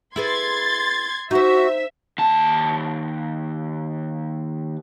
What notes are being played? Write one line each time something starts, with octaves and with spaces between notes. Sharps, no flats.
E4 G#4 B4 C6 G#6 A6
D#4 F#4 C5 E5
D#2 A5